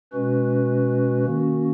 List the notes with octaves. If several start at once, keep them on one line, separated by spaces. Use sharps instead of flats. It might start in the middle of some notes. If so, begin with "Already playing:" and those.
B2 G#3 C#4 F#4 B4
D#3 A#3 C#4 F#4